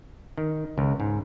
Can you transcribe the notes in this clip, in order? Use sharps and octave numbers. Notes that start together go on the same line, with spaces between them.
D#3
C#2
G#2